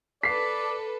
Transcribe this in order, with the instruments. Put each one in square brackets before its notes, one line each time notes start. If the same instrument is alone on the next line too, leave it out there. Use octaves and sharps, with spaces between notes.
[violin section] A4 B4 [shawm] D5 [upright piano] B6 C7